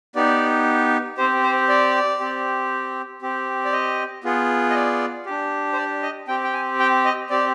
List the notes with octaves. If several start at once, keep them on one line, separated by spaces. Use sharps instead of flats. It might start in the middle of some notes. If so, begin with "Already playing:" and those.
B3 D#4 G4 D5
C4 G4 C5
C5
D5
C4 G4
C4 G4
D5
D#5
B3 F4 G#4
D#5
D5
D4 G4
C5
D5
D#5
C4 G4 G5
G5
G#5
G5
D#5
C4 G4 D5